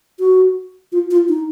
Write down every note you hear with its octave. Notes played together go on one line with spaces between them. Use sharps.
F#4
F4
F4
D#4